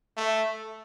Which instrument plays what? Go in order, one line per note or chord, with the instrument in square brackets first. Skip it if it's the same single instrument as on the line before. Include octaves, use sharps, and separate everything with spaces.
[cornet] A3